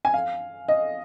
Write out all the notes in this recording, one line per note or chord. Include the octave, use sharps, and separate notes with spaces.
G#5
F5
D#5